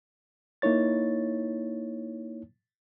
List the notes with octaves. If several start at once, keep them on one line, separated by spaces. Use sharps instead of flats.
A#3 D#4 E4 C#5 A6